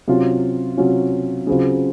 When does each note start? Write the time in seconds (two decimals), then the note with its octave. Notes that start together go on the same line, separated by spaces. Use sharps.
0.07 C3 F#3 C#4 F4
0.77 C3 F#3 C#4 F4
1.47 C#3 F#3 C4 F4